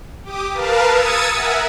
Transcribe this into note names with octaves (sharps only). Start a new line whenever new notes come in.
G4 D6 D#6
A#4 B4 F5 A5
D#6 E6 G#6 A6 C#7 D#7
A#4 E5 F#5 G#5